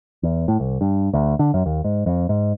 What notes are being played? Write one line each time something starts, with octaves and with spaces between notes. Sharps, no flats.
E2
A2
C2
G2
D2
D3
F#2
D#2
G#2
F2
G#2